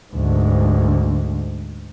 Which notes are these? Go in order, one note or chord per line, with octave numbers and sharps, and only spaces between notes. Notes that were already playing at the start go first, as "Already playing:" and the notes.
D2 G#2